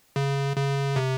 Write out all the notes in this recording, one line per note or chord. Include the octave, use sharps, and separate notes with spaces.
C#3
C#3
C3